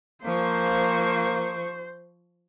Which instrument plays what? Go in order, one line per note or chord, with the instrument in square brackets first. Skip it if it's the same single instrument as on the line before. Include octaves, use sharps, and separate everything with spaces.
[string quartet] F3 C#6 [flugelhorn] A#3 [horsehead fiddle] C5